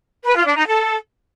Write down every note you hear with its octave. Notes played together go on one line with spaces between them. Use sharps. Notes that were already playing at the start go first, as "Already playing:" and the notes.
B4
F4
D4
D#4
A4